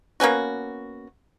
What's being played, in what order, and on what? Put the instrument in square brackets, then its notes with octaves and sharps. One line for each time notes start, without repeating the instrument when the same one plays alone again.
[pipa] A#3 B3 C#4 F#4